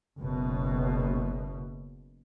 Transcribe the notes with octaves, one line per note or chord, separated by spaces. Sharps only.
F#1 B2